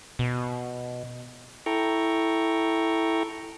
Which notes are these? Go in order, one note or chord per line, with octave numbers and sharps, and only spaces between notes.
B2
E4 A4 G5 A#5 C#6